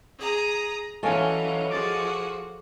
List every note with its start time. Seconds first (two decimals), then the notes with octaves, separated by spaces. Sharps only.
0.19 G#4 A#5 D#6
1.03 E3 F#3 C#4 A4 C#5 D#5 F5 G#5
1.71 F3 F#4 G#4 D6 A6